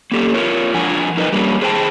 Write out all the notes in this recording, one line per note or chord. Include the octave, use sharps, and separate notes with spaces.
A#3 C#4 G4 A4
F4 A#4 C#5
F3 D4 F#5 G#5
D#4 A#4 B4 D#5
G3 A#3 C#4 D4
G#4 C5 D5 F#5 G5 A5